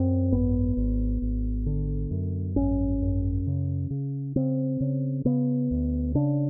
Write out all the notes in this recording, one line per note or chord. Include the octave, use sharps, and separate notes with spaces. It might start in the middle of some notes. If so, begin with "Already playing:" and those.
Already playing: F#2 C4
G#1 B3
G#1
G#1
D3
F#2
G#1 C#4
F#2
C#3
C#3
C#3 C4
C#3
C#3 B3
D2
C#3 D4